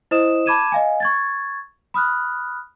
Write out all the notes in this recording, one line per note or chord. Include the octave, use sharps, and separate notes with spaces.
E4 C5 D#5 D#6 E7
A5 B5 D6 G#6 D#7 E7
D#5 F5 G#5
C#6 G#6 A6
B5 D#6 F6 F#6